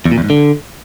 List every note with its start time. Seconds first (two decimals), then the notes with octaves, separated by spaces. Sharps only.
0.06 E2
0.12 A#2
0.18 E2
0.24 G#2
0.30 D3